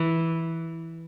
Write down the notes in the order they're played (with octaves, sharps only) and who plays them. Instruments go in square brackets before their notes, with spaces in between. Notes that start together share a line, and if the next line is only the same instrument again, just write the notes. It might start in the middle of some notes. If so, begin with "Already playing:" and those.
Already playing: [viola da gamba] E3